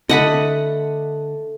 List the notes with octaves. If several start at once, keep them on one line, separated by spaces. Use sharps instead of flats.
D3 A3 D#5 F#5 B5